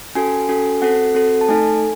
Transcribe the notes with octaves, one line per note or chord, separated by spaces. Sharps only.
C#4 F#4 A4 G#5
C#4 F#4 A4
C4 F#4 A4 F#5
C4 F#4 A4
A5
A3 D#4 A4 G#5